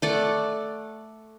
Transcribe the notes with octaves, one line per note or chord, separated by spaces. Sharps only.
A3 D5 F#5